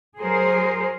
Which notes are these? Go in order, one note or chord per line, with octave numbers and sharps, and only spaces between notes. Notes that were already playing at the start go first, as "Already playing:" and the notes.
F#3 G#4 A#4 C5